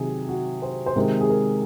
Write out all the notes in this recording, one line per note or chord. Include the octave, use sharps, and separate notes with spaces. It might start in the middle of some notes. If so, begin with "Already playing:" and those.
Already playing: C3 D#3 F#3 G#4
F#4
C5
C5
C3 D#3 G#3 A#4
G#4
A#4